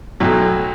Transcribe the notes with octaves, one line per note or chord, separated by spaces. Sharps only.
B1 A2 F#3